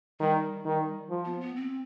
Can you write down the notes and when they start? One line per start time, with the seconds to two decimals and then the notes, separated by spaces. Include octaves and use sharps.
0.20 D#3 G3
0.65 D#3
1.10 F3
1.25 B3
1.41 B3
1.56 C4